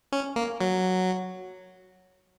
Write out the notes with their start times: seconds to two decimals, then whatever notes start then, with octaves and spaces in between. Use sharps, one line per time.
0.12 C#4
0.36 A#3
0.61 F#3